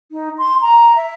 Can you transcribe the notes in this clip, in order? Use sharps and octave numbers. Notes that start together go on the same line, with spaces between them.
D#4
C6
A#5
E5